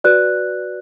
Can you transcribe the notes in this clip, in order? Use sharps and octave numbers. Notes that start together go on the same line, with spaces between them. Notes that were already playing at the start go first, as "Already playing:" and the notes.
F#4 B4 D5 F#6